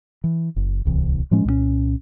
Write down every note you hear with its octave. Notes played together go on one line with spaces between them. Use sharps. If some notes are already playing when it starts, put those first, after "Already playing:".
E3
F#1
D1 C2 E3
A2 F3 G#3 C#4
C2 A#2 A3 C#4